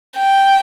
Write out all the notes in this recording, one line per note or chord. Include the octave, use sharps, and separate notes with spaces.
G5